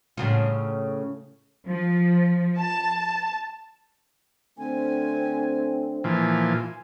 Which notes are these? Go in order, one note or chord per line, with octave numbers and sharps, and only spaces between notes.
A2 C#3 F4
F3
A5
D3 A3 C4 G#5
A#2 E3 F3 G#5